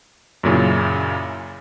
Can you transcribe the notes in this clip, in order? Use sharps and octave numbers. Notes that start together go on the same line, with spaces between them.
F#2 A#2 C#3 E4